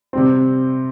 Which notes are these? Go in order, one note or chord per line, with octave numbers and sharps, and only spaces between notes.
C3 G3 C4